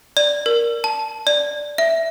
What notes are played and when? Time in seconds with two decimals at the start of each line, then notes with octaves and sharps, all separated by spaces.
0.17 D5
0.46 A#4
0.84 A5
1.27 D5
1.78 E5